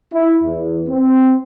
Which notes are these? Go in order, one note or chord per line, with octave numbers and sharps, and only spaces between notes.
E4
E2
C4